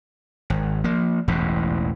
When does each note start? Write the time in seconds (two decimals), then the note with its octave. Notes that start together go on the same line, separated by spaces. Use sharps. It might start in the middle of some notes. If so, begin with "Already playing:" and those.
0.50 G#1
0.84 F3 A#3
1.28 E1 A1 E2 G#2